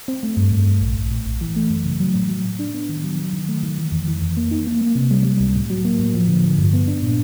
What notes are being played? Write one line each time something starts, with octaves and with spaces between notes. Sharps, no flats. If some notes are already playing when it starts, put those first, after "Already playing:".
C4
A3
G2
G2
G2
A#1
A#1
A2
A#1
E3
A3
F#2
C#3
F#3
A2
F#3
A2
D4
B3
D#3
F#3
F#3
D#3
A3
D#3
E3
F2
E3
F2
A#3
D#4
A#3
A#3
C3
G3
G3
C#2
A2
F#3
A#3
A2
F3
D3
F3
G2
B3
D4
A#2